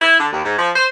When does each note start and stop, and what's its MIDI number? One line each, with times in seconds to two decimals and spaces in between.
0.02 0.17 64
0.20 0.29 50
0.33 0.43 39
0.45 0.55 44
0.59 0.71 53
0.76 0.87 72